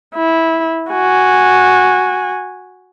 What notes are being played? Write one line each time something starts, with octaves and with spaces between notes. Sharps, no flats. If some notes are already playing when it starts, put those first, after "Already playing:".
E4
F#4 G#5